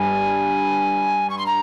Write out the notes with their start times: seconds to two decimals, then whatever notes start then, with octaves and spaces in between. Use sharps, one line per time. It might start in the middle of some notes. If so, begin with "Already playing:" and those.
Already playing: G2 G3 G#5
1.30 C#6
1.38 C6
1.46 A#5